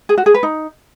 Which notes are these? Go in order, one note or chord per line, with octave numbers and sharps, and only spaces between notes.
G#4
F#4
G#4
B4
D#4